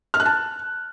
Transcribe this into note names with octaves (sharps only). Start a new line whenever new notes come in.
F6
F#6
A5